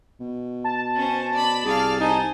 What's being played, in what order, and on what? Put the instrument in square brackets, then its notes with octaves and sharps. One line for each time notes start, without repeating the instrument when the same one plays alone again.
[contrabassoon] B2
[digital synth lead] A5
[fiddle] C#4 C5
D5 B5
[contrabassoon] C2 [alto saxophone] G#4 [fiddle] D5 F5
[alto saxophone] D#4 [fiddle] C5 G#5